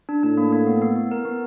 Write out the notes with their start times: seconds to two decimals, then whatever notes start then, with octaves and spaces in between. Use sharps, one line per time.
0.09 D4
0.23 A2 D4
0.37 A#3
0.52 A#3
0.67 B3
0.82 B3
0.96 B3
1.11 A#4
1.25 B3